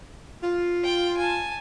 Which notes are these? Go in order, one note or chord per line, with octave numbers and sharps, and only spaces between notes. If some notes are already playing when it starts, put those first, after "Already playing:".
F4
G5
G#5 A5